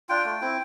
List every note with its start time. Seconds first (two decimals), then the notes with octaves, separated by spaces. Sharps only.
0.09 D4 F4 G5
0.25 A3
0.41 C4 E4